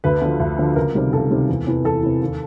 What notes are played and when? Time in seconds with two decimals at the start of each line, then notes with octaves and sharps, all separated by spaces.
0.04 D2 B4
0.22 D3 F3
0.40 D2
0.58 D3 F3
0.76 C#2 A#4
0.94 C3 D#3 G3
1.13 C#2 A4
1.30 C3 D#3 G3
1.49 E2
1.67 C3 E3
1.85 E2 A4
2.03 C3 E3
2.21 D#2